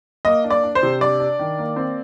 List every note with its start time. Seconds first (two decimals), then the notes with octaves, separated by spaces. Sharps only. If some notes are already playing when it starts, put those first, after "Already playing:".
0.25 A#3 D#5
0.44 D4
0.50 D5
0.63 D4
0.75 C5
0.83 C3
1.01 D4 D5
1.20 D4
1.39 D#3
1.58 A#3
1.76 C4